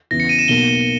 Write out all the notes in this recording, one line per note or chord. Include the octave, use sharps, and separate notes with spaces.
E2 C#3 E3 A#6
C#7
D#7
E7
B1 B2 A#3 G7